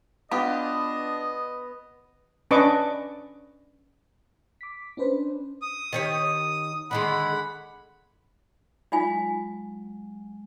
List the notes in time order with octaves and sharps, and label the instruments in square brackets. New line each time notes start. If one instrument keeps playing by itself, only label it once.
[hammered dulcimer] B3 [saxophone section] D4 [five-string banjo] F4 G4 [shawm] D#5
[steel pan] C#4 D4 B4 D#5 C#6 D6
[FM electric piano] D6 B6
C#4 D4 B4 C5
[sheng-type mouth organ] D#6
[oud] D#3 G4 C#5
[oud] D3 D#3 G#3 [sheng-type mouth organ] F#5 B5
[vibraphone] F#3 G#3 [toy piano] D#4 F4 G#5